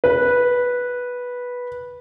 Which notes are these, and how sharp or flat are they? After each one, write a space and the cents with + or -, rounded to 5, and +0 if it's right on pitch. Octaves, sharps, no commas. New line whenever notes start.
B4 -10